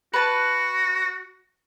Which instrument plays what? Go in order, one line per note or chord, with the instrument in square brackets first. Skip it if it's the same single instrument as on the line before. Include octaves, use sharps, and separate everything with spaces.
[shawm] F#4 [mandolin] B4 A5